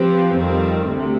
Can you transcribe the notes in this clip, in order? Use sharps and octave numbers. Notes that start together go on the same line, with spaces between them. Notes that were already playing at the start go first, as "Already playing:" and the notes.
Already playing: F3 C4 G4 B4
F2 D#3 G3 C4
D2 C3